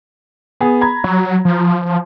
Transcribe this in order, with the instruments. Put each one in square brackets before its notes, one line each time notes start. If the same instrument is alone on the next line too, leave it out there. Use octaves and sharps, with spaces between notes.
[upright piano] B3 G#4
A#5 B5 G#6
[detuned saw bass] F#3
F3